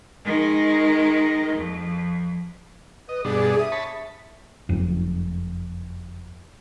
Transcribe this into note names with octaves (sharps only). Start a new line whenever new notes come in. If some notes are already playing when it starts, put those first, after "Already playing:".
D#3 G#3
F2
B4 D#5
G2 B2 D4 G#4
E5 D#6
C#5 A5 B5
F#1 F2